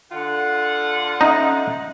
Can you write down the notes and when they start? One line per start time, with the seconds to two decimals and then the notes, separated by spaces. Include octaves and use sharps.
0.12 D3 F4 F#5
1.21 C#4 D#4 D#5 E5